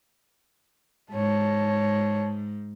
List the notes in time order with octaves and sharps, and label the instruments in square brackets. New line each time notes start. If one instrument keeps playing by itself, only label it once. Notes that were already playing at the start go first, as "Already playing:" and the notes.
[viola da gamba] G#2 [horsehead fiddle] C#5 A5